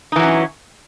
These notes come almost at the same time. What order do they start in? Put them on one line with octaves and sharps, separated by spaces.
D#4 E3 F#3 C#4